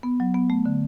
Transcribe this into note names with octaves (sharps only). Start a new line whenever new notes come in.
B3
F#3
B3
A3
D3